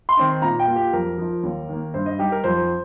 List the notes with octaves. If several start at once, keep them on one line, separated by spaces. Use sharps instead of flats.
C6
D#3 C4 D#4
A#2 A#5
G5
A#3 F4
G4
F2 A#4
F3 D#4
D#2
D#3 A#3
G2 C5
D#5
G3 D#4 G4
A#4
F2 C5